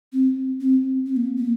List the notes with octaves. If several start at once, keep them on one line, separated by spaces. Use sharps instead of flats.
C4
C4
C4
A#3
A#3